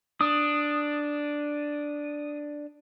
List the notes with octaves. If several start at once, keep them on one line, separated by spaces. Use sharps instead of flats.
D4 D#6